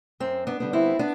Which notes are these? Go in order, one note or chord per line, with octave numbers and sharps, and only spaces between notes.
F#2 C4
B3 D4
D3 G3 B3
C4 E4
B3 D4